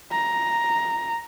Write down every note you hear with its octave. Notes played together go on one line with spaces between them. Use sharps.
A#5